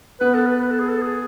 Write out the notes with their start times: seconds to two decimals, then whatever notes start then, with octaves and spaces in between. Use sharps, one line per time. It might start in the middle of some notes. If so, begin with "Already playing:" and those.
0.20 B3 B4
0.34 A4
0.46 B4
0.62 B4
0.71 A4
0.80 G#4
0.89 A4
1.02 G#4